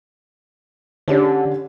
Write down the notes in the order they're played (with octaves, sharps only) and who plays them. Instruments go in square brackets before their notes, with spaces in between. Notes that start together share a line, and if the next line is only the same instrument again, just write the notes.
[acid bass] D3 [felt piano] C#4 D4 G4